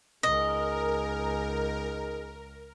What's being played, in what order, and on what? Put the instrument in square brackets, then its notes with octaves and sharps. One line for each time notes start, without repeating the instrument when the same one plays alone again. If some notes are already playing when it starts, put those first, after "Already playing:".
[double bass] C#2 [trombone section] D#4 G#4 [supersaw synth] A#4 [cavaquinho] D#5